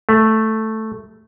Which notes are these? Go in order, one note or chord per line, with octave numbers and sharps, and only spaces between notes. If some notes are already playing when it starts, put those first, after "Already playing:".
A3